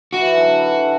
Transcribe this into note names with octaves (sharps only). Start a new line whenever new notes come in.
E3 F#4
E3
D3 F#3
D3 F#3
E3
D3